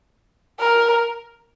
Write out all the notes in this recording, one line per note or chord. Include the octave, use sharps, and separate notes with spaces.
A#4